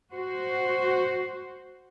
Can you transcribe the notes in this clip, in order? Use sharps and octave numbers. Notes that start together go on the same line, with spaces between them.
F#4 C5